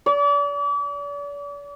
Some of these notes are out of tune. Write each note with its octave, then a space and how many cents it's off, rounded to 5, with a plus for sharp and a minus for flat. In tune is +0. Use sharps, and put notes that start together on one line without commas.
D5 -40